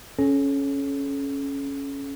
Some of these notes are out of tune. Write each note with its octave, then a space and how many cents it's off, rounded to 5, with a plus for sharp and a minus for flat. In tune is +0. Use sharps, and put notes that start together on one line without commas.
C#4 +0 A4 -40